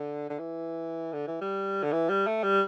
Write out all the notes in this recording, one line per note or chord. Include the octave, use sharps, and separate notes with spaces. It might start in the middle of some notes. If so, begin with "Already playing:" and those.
Already playing: D3
D3
E3
D3
E3
G3
D3
E3
G3
A3
G3